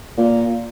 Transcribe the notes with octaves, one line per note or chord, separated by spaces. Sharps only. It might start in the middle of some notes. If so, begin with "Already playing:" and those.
A#2